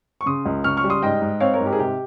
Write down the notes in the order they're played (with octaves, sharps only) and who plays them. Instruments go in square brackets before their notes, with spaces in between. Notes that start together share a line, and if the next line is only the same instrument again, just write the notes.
[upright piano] C#6
C#3 C6 D#6
C#2
C#3 C#6 F6
C#6 F6
G3
C6 D#6
G#2 D#5 G5
G#2
C4 C#5 F5
A#4 C#5
G#2
G4 A#4
G#4
C3 G4